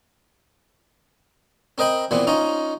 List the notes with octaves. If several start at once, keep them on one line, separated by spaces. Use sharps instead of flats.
C4 A#4 D#5 G5 B5
A#2 E3 B3 C4
C#4 D#4 F4 A#5